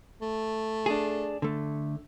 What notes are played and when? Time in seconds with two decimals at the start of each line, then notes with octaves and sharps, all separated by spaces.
0.22 A3
0.86 D4 G#4
1.42 D3 A3